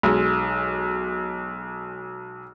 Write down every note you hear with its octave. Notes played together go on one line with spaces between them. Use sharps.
B1 G#3